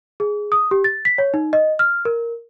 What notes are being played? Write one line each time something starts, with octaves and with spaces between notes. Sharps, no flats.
G#4
D#6
G4
A6
B6
C#5
D#4
D#5
F6
A#4